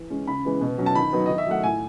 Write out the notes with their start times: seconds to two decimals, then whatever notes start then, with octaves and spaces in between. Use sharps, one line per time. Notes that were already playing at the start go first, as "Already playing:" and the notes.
Already playing: E3
0.10 G#3 C#4
0.27 C#3 B5
0.45 E3 G#3 B3
0.61 B2
0.78 F#3 C#4
0.86 A5
0.95 D#3 B5
1.13 F#3 B3 D#4
1.26 D#3 D#5
1.38 E5
1.47 F#3 A3 F#5
1.63 A2 G#5